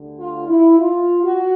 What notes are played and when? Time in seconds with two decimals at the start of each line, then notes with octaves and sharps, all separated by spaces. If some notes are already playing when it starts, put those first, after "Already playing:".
Already playing: D2 D3 G3
0.18 F4
0.48 E4
0.79 F4
1.24 F#4